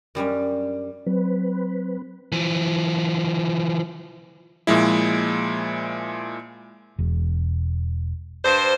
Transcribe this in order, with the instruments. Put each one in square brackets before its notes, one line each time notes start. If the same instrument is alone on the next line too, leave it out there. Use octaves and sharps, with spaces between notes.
[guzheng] F#2 G3 C#4 D4
[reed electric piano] F#3 [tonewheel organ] C4 B4
[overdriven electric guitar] E3 F3
[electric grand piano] A#2 F3 G#3 E4
[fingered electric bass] E1
[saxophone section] G2 C5